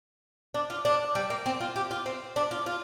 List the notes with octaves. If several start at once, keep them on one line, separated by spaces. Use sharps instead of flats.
D4
F4
D4
G3
A#3
C4
F4
G4
F4
C4
D4
F4
F4